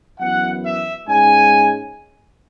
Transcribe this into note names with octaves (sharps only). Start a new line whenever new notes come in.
F#2 E3 B3 F#5
E5
G#2 G#3 C#4 G#5